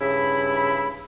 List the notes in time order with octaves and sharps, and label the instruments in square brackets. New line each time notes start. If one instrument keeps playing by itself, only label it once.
[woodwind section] G2 C#3 E4 B5